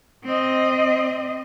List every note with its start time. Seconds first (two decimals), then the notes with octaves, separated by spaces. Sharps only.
0.24 C4 D#5